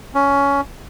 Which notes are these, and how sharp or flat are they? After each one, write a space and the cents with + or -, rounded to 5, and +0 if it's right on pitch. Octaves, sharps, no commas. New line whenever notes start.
C#4 +15